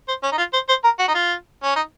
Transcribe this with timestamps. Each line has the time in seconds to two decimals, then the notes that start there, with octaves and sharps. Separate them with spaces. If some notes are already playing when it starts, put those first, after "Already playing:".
0.08 C5
0.23 C#4
0.32 D#4
0.38 F4
0.53 C5
0.69 C5
0.84 A#4
0.99 F#4
1.08 D#4
1.15 F4
1.63 C#4
1.76 D#4